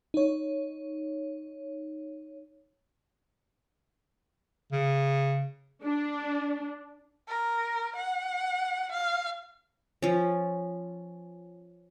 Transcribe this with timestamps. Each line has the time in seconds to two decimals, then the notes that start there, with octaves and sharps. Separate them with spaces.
0.14 D#4 C#5
4.72 C#3
5.83 D4
7.28 A#4
7.96 F#5
8.92 F5
10.02 F3 C#4